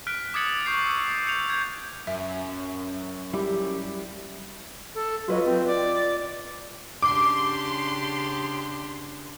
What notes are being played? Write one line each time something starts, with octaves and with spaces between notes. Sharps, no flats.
F6 F#6 B6 D7
D6 D#6 G#6 A6 C#7 F#7
C#6 D6 G6 A6 C7
E6 C#7
G6 C#7 F7
G6 G#6
F#2 E5
G3 E4 G4
A4
F#3 F4 B4 D#5
C4
D5
C#3 D4 G4 C6 D6